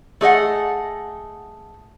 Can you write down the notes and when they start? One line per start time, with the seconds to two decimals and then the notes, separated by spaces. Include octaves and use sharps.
0.21 A3 G#4 D#5 F#5